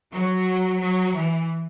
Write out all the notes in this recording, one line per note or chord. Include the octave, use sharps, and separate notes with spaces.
F#3
F#3
E3